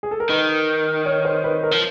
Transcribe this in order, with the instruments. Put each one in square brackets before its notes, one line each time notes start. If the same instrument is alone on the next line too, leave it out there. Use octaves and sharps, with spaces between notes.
[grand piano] G#4
A4
A#4
[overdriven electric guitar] D#3 [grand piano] B4
[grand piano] C#5
C5
B4
A#4
[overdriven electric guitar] F3